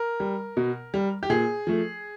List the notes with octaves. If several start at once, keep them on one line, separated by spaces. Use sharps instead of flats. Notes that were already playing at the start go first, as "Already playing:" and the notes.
Already playing: A#4
G3
B2
G3
G4
A#2 G#4
F3 A3